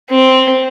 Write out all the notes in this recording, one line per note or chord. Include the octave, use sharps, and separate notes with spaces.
C4